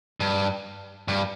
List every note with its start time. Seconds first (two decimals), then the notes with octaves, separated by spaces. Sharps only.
0.20 G2
1.08 G2